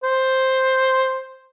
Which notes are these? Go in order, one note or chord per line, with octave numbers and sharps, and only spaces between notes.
C5